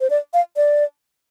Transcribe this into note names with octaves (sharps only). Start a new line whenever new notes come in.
C5
D5
F5
D5